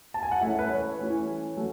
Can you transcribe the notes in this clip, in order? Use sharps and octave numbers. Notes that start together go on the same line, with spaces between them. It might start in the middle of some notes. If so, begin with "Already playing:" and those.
A5
G#5
F#5
E3 A3 C#4 E5
B4
C#5
E3 A3 C#4
F#3 A3 C#4